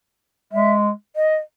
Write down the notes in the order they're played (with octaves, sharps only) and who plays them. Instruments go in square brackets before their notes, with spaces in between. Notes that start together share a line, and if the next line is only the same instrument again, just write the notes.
[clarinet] G#3 [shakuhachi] E5
[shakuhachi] D#5